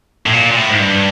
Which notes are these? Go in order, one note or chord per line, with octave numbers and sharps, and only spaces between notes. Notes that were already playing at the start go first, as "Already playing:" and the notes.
A2
A#2
A#2
A2
G#2
G2